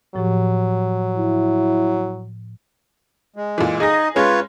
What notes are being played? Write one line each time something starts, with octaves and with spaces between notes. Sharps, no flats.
A2 F3 F#3 G4
E4
G#3
A#2 E3
D#4 G#4 D#5 A#6
G#3 C#4 F4 B4 C#5